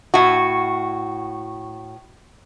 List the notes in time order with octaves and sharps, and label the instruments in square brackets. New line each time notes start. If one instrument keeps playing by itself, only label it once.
[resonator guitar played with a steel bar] A2 F#4